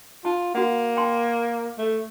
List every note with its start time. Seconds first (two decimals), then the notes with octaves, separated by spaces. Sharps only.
0.25 F4 A5
0.55 A#3 F#4 F#5
0.97 G5 A5 C6
1.78 A3